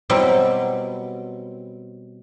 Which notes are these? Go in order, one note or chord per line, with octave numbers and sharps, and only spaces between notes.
B2 F#3 G3 C4 E4